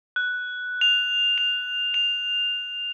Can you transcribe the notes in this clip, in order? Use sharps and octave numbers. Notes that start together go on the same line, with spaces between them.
F#6
F7
F7
F7